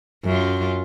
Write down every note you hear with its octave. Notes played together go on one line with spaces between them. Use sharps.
F#2 F4